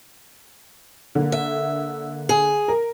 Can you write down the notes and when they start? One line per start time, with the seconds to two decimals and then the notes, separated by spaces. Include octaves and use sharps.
1.15 D3 A#3
1.32 E5
2.29 G#4
2.68 A#4